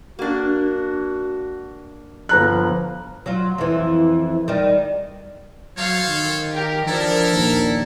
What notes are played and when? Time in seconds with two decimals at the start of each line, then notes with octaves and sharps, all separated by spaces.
0.19 A#3 D4 F#4
2.29 G1 F3 A#5 F#6
3.26 F#3 F4
3.58 F2 E3
4.48 D#3 G3
5.76 F#3 A4 C5 C#5 F5
6.09 D#3
6.54 G4 A#4
6.87 F3 D4 E4 A4 A#4
7.31 A#1 D#2